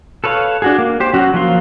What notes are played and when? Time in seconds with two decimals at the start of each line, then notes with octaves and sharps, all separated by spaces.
0.24 A4 B4 C#5 F5
0.62 D4 F#4 G#4
0.78 A#3
1.00 G4 C5
1.14 F#3 C#4 F#4
1.34 F3 F#3 A#3 F5 C6